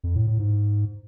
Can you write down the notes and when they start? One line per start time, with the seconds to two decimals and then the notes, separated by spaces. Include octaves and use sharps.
0.04 F2
0.15 A2
0.27 A2
0.39 G#2